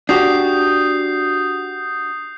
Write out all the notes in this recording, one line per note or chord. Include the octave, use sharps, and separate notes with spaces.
D4 F#4 G4 D#6 G6 C7